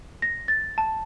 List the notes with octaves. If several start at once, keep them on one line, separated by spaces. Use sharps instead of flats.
A#6
A6
A5